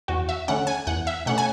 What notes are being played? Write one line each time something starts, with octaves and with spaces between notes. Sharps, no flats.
E2 F#4
E5
D3 A3 C#4 F#5
G#5
E2 F#5
E5
B2 A3 C#4 F#5
G#5